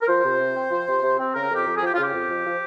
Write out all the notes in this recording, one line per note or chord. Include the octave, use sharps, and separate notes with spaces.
A#4
F3 C5
C3
C3
C4
F3
C3
C3
C4
C#3 A#4
F2
G4
F2
G#4
F3 G4
F4
C#3
G4
F2
F2
F3